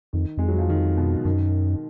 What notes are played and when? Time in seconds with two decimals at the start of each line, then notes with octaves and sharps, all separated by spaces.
0.13 F2 D#3
0.37 F2 G#3
0.48 F#3
0.59 F3
0.69 D#3
0.97 B2
1.25 F#2 D#3